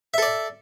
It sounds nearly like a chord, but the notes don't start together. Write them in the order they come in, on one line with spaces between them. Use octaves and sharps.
E5 A4 D5